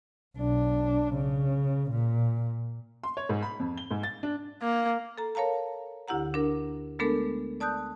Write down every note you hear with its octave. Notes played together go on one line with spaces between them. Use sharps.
B1 D4
C#3
A#2
C6
C#5
G#2
B5
F2
G7
G#2
A6
D4
A#3
A4 A#5
A#4 C#5 F5 A5 A#5
D2 D3 E4 G4 F#5 A#5
D4 A#4
G#3 A3 B3 D4 A4 A#4
D5 A5 D#6 F#6 G6